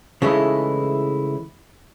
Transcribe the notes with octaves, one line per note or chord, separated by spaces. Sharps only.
C#3 E3 G#3 A3 D#4 E4